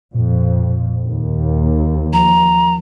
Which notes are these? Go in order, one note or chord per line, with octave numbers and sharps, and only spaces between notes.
F2 A#2
D#2
F3 A#5